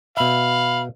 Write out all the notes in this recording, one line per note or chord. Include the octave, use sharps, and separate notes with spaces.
B2 E5 F5 B5